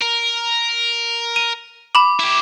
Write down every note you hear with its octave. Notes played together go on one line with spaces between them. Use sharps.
A#4
D#7
B5 D6 F#7
E4 G4